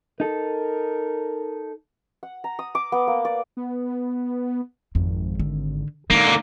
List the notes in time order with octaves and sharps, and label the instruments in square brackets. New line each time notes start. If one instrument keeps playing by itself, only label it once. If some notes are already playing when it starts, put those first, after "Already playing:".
[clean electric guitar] D#4 A4 [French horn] A#4
[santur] F#5
A#5
D#6
D6
B3
A#3
D5
[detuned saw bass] B3
[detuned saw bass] G#1 [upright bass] F2
[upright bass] D3
[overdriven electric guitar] D3 A#3 [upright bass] G#3 D#4